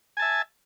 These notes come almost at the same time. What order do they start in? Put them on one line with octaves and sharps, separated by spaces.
G#5 A5 E5